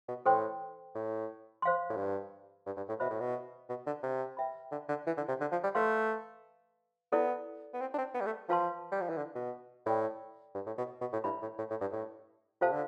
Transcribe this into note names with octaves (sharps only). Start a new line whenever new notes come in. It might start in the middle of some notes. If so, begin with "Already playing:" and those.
B2
A2 A4 C5 G5 C6
A2
C5 F5 C6
A2
G2
G2
G2
A2
B2 C5 E5 B5
A2
B2
B2
D3
C3
B4 E5 G5 B5
D3
D3
E3
D3
C3
D3
F3
G3
A3 B4 F5 C6
B3 E4 A4 D5
B3
C4
D4
C4
B3
G3
A3
F3 F4 B4 F5 A5 C6
G3
F3
E3
D3
B2
A2 A4 D5 G5 B5
G2
A2
B2
B2
A2
G2 E4 B4 E5 B5
A2
A2
A2
G2
A2
C3 F4 A4 C5 F5 A5
D3